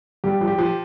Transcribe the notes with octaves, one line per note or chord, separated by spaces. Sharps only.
G2 G4
F3
G4
F3